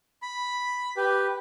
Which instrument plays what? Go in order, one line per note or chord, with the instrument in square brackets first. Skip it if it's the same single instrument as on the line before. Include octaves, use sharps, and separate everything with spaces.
[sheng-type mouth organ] B5
G4 B4